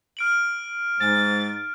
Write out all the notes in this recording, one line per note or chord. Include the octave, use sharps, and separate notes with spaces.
F6 D7 F#7
G#2 A6